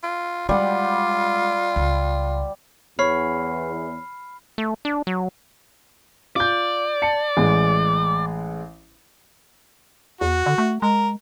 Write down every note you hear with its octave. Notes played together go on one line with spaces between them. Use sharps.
F4
G3 G#3 F4 F#5
C#2
E2 C#5 B5 F6 C7
A3
D4
F#3
F4 D5 G6
A5 C#7
A1 G#3
E2 F#4
D3
A3
G#3 A#4